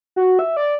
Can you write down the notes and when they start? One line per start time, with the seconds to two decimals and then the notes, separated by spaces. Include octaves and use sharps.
0.16 F#4
0.39 E5
0.57 D5